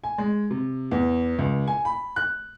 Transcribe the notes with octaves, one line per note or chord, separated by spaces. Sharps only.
G#5
G#3
C3
E2
C#2
G#5
B5
F#6